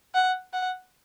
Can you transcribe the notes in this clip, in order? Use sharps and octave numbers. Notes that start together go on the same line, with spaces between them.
F#5
F#5